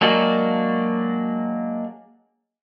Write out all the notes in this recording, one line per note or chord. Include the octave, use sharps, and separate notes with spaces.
F#3 G#3 A#3 D4 F#4